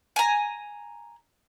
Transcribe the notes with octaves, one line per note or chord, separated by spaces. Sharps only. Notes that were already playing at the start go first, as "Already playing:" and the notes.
G#5 A#5